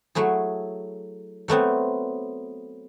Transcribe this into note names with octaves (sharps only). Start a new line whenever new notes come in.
F#3 A3 E4 G#4
F#3 A3 B3 C4